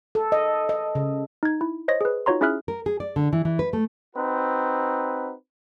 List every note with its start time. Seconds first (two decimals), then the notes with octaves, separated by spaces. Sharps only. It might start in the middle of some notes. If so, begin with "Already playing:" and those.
0.15 A4
0.32 D#5
0.69 D#5
0.95 C#3
1.43 D#4 G#6
1.61 E4
1.88 C5 C#5 D#5 A#6
2.01 G#4 B4
2.26 D#4 F4 F#4 C#5 A#5 C6
2.41 C#4 E4 G#4 E5 F6 F#6
2.68 A#4
2.86 G#4
3.00 D5
3.16 D3
3.33 E3
3.45 E3
3.59 B4
3.73 A3
4.16 C4 D#4 F#4 B4